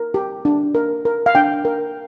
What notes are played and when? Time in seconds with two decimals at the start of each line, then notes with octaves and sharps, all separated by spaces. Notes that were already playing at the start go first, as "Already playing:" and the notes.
Already playing: A#4
0.14 G4
0.45 D4
0.75 A#4
1.05 A#4
1.26 F5
1.35 D4 G5
1.65 A#4